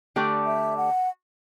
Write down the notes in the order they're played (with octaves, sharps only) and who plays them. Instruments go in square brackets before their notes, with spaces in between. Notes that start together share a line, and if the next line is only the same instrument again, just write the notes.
[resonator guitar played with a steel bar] D3 A3 D4 G4 D5
[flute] E5
F#5